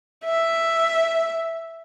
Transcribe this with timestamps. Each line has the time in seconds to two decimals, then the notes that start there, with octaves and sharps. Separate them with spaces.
0.25 E5